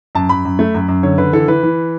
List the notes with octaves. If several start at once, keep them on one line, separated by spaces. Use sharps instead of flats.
F#2 A5
F#2 B5
F#2
A3
F#2
F#2
D3 C#5
D3 B4
E3 A4
E3 B4
E3